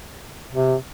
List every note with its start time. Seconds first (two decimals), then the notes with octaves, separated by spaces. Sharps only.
0.53 C3